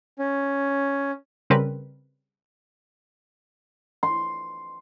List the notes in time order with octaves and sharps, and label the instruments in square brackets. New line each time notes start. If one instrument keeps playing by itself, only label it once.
[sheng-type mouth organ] C#4
[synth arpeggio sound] C#3 G3 C4 A#4 B4
[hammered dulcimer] C6